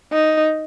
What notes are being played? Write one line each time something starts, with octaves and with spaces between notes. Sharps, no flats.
D#4